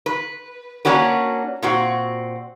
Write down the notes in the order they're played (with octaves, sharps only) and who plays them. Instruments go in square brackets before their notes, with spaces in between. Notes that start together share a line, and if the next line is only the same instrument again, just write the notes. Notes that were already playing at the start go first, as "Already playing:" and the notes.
[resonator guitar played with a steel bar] B4
A#3 C#4 D4 F#4 B4
A#2 C4 F#4